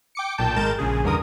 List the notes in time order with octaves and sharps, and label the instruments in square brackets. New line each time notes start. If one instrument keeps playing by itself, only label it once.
[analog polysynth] G5 D6 C#7
B1 A#2 G5 A5 G6
G#1 G#3 A#4 G6 A6 E7
A#1 C#3 G#4
E2 G2 D3 A#4 D#6